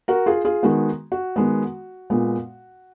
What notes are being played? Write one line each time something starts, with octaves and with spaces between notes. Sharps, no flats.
F#4 A#4
F4 G#4
F4 G#4
D#3 G#3 B3 F#4
F#4
D#3 G#3 B3
A#2 G#3 B3